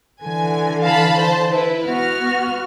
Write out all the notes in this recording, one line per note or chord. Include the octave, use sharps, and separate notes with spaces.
D3 E3 G#5
F5 A5 B5
C5 A5
E4 B4
B3 F#4 F6